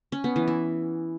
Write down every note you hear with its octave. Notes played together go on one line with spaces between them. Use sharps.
C#4
B3
E3
E4